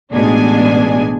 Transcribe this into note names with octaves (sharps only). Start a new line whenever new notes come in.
A1 B2 G#3 D4 G#5